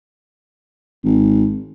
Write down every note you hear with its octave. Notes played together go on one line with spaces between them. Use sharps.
G#1